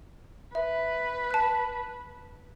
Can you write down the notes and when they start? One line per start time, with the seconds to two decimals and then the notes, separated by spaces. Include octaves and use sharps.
0.55 B4 E5
1.31 A5 F#6